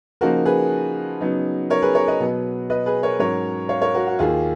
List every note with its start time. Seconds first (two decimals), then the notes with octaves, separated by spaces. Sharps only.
0.21 C#3 F3 A#3 D#4 F#4 A#4
0.46 G#4 B4
1.21 C#3 F#3 B3 D#4
1.70 A#4 C#5
1.82 G#4 B4
1.95 A#4 C#5
2.08 B4 D#5
2.20 B2 F#3 B3
2.70 B4 D#5
2.86 G#4 B4
3.03 A#4 C#5
3.19 G#2 F#3 C#4 A#4 C#5
3.69 C#5 F5
3.82 A#4 C#5
3.94 F#4 A#4
4.07 F#4
4.19 D#2 D#3 A#3 F4 G#4